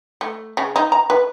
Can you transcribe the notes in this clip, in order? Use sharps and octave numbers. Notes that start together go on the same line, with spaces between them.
A3
C#3
D#4
A#5
B4